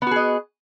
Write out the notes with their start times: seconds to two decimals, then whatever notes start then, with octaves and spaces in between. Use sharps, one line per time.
0.02 B3
0.07 F#4
0.11 G#4
0.16 D#5